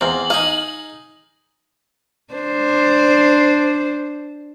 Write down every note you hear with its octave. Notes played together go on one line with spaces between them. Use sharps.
E2 C4 F5 F#7
D#4 G#4 F5
D4 C5